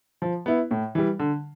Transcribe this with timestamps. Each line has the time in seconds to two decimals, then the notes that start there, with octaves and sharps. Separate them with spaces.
0.22 F3
0.46 B3 E4
0.71 A2
0.95 E3 G3
1.19 D3